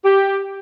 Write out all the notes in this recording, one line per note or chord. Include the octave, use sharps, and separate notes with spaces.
G4